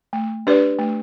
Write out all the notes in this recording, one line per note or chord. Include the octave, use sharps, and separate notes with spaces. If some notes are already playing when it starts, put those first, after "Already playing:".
A3
D4 G4 B4 D5
A3